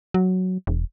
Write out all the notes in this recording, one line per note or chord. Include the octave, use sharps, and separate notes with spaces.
F#3
E1